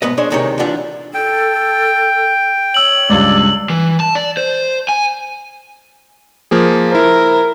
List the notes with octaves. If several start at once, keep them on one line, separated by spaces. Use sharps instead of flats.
B1 G#2 B3 B4 D#5
G#3 D4 C5 C#5
C#2 A2 C3 D#3 G#3 C#5
A2 E3 D4 E4 F4 F#5
A4 G5
C#5 E6 F#7
C#2 G2 D5
E3
A5
D5
C5
G#5
F3 A#3 G#4
E4 A#4 C5